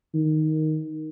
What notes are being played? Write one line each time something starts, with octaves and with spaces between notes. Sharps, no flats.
D#3